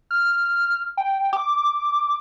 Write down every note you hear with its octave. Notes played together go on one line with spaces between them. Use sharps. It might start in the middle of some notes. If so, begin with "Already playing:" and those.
F6
G5
D6